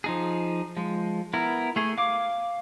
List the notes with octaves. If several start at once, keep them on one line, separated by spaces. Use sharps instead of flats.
F3 D#4 G#4
F3 G#3
B3 E4 A#4
A3 G#4
F5 D6